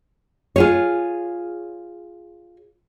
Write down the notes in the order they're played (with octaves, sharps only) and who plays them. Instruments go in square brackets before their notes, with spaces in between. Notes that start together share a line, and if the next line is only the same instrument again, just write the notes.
[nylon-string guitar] F4 G#4 C#5